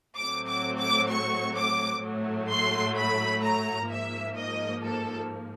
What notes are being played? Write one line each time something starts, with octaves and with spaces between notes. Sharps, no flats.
A2 F#3 A3 C4 D6
D6
D6
C#6
D6
A2 F#3 A3
C6
B5
A#5
G#2 F3 A#3 E5
D#5
A4